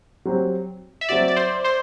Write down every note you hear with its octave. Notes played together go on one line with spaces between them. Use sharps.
F#3 C4 G4
E5
F#3 C4 F#4 D5
D5
C5
C5